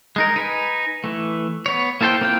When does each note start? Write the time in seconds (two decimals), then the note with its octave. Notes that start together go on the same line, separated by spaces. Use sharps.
0.16 G#3 D#4 A#4
0.36 D#4 B4 G#5
1.04 E3 A3
1.66 B3 C#5
2.01 A#3 E4 A4 C5 G5
2.21 A#3 C4 E4 F4 G5